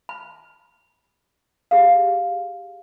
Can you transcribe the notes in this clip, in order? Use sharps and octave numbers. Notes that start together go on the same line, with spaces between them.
B5
G4 G#4 F5